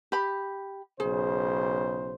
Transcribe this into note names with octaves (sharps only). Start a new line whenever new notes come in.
G4 B5
B1 C#3 G#4 C5